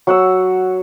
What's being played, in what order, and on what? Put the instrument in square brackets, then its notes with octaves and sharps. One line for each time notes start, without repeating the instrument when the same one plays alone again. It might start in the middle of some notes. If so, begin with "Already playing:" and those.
[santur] F#3 F#5 E6